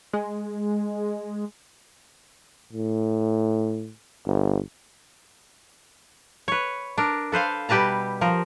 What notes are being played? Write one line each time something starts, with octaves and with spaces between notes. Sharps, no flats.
G#3
A2
G1
B4 C#5
D4 A#4
A4 B4 C5 F5
B2 G3 G4 B4 A5 A#5
F3 A#4